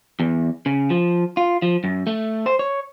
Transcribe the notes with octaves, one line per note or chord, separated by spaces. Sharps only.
E2
C#3
F3
F4
F3
F#2
A3
C5
C#5